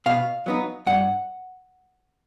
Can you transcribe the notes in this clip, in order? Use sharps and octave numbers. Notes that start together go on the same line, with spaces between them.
B2 F5
F#3 B3 D#4
G2 F#5